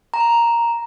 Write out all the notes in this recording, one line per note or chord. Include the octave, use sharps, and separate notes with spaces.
A#5